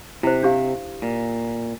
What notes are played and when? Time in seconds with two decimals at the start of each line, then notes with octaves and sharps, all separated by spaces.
0.23 C3 E4 C5
0.43 D4 G4 F5
1.02 A#2